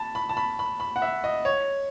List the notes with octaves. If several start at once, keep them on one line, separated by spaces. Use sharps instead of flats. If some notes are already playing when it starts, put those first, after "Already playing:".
Already playing: A5 B5
B5
A5
B5
B5
B5
F#5
E5
D#5
C#5